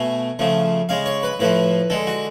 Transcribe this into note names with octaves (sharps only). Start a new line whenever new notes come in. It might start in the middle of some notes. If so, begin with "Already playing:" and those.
Already playing: B2 A3 G#5
C#3 F3 A3
C#3 G#3 F5
C#5
B4
A2 F3 A3 B4
D3 G#3 A4
F#4